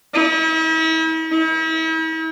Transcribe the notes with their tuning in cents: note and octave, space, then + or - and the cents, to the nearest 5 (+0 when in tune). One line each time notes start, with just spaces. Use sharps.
E4 -45
E4 -45